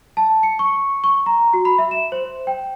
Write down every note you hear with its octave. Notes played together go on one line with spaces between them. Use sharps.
A5
C#7
C#6
C#6
A#5
F#4
B5
E5
E7
C5
G5